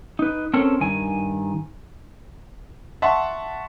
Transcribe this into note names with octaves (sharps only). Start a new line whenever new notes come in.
D#4 B4
C4 C#4 A4 A#4
G2 D#3 G#5
E5 F#5 A5 C6 C#6